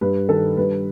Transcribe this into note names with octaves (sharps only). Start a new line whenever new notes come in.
G2 B4
D#3 A4
G2 B4